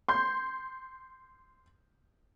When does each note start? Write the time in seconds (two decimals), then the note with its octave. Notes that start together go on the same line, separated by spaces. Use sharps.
0.08 C6 G6